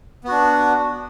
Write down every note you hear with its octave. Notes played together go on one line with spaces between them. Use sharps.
B3 D4 F#4